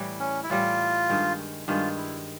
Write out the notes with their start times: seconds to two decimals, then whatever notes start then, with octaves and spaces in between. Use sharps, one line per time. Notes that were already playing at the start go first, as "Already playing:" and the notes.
Already playing: A2 E3 G3
0.20 C#4
0.43 E4
0.50 A2 E3 G3 F4
1.09 G2 D#3 G#3
1.68 G2 D#3 G#3 F4
1.97 E4